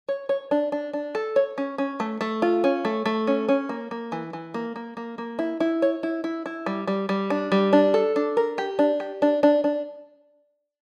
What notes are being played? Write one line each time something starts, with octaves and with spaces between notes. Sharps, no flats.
C#5
C#5
D4
D4
D4
A4
C#5
C#4
C#4
A3
A3
F4
C#4
A3
A3
C#4
C#4
A#3
A#3
E3
E3
A#3
A#3
A#3
A#3
E4
E4
C#5
E4
E4
E4
G3
G3
G3
D4
G3
D4
A4
D4
A#4
G4
D4
G4
D4
D4
D4